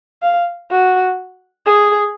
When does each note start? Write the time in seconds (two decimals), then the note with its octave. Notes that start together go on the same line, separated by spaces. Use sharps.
0.22 F5
0.71 F#4
1.66 G#4